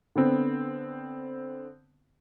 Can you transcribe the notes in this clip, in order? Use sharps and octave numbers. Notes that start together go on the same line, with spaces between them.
D3 B3 C4